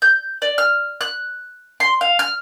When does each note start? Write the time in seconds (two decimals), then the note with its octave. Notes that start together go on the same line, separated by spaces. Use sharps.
0.02 G6
0.42 D5
0.58 F6
1.01 F#6
1.80 C6
2.01 F5
2.19 F6